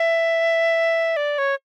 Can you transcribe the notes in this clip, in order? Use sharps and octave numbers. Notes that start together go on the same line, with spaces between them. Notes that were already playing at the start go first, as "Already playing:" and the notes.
Already playing: E5
D5
C#5